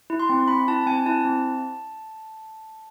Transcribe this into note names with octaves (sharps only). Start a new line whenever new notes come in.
E4
C6
C4
C4 B5
E4 A5
C4 G#5
E4 A5
C4